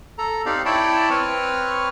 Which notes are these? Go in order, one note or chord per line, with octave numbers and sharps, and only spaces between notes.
A4 A#5
C4 D#4 G4 D5 F5
E4 C#5 D5 G5 A5 B5
C4 B4 C#5 F6